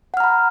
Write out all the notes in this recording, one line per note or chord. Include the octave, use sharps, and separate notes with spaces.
F#5 A#5 B5 F6